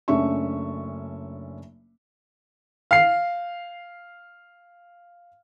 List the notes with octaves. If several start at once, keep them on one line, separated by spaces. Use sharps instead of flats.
F#1 A3 C#4 D4 E5 C#6
F5 C7